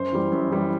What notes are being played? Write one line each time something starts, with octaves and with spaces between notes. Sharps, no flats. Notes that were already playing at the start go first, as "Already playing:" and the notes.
Already playing: F#2 C5
E3 G3
F#2
E3 G3